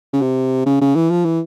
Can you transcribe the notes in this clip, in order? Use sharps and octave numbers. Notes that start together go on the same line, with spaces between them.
C#3
C3
C#3
C#3
E3
F3
E3